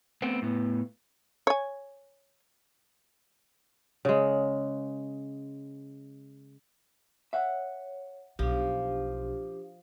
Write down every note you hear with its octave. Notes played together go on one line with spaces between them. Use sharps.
A3 B3 C4
A2 B3
C#5 G#5
C#3 G#3
C#5 E5 F#5
B1 F3 D4 G4